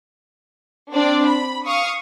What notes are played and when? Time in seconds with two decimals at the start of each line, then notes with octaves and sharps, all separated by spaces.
0.94 C4 D4 D5
1.27 B5
1.66 F5 C#6 D#6